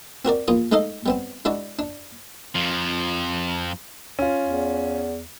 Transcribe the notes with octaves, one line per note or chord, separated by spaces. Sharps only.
C4 F#4 A#4 D5
E2 A#3 F4 D#6
G#3 A3 D#4 A4 D#5 F5
G3 B3 C4
G#3 D4 E4 F#4 D5
D4
F2 F3
C#4 F4
E2